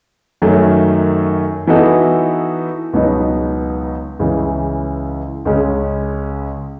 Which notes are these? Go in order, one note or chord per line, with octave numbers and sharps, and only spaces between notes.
F#2 D#3 F#3 A3
E3 B3 D#4 F#4 A4
C#2 B2 F#3 B3 D#4
C#2 C#3 E3
C#2 C#3 G#3 C#4